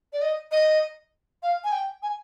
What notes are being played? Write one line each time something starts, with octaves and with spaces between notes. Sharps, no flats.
D5
D#5
D#5
F5
G#5
G5
G#5